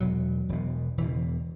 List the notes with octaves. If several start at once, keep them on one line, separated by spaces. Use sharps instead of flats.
E1 E2 B2 F#3
E1 E2 B2
E1 E2 B2 E3
C#3
E3